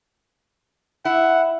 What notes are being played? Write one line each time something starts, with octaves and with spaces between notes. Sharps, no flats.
E4 F#5